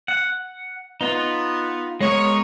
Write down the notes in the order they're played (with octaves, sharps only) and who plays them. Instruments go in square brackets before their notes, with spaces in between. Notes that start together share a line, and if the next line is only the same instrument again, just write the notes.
[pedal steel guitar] F#5
[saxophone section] B3 [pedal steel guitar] D#4 F4
[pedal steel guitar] G#3 B3 A#4 [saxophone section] C#5